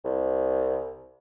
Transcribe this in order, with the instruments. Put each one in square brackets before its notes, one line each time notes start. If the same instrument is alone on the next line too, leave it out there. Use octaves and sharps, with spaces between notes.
[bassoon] C2